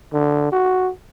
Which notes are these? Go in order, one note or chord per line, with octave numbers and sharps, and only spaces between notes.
D3
F#4